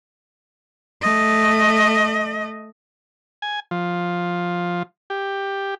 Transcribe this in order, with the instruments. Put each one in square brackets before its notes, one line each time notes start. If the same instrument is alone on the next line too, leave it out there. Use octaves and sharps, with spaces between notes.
[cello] A3 D#5
[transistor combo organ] G#5
F3
G4